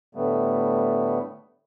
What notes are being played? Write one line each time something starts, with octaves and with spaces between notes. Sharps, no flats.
A2 D3 G3 A3 B3